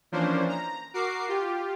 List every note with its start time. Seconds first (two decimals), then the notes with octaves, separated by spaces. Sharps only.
0.12 E3 F3 A#3 C#4 D4 C5
0.49 A#5
0.94 F#4 A#4 D6 C7
1.28 F4 G4